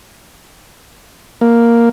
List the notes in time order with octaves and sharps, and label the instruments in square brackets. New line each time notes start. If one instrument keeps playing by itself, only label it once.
[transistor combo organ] A#3